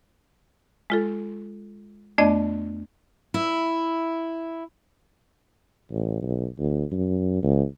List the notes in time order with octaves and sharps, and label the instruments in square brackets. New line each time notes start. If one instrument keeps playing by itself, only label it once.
[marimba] G#3 F4 A4
F2 A3 B3 D4 D5 D#5
[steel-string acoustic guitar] E4
[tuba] A1
B1
D2
F#2
C#2